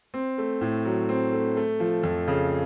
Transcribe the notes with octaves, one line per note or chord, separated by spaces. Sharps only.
C4
A3
A2
F#3
C4
A3
A3
F3
F2
C#3